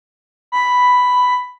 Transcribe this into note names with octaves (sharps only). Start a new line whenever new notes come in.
B5